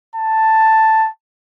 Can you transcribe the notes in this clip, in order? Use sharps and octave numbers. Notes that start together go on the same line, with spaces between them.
A5